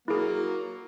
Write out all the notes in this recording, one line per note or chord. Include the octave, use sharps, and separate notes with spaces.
F#3 A#3 E4 G#4